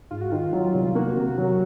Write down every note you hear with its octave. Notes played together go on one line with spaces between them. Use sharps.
G#2 F4
F#4
D#3 F4
F#3
C2
A#3 F#4
C3
F#3